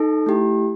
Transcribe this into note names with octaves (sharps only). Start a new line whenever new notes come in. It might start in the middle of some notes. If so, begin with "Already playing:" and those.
Already playing: D#4 A4
A3 E4 G4